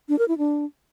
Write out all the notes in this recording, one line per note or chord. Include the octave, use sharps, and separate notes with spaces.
D4
A#4
E4
D4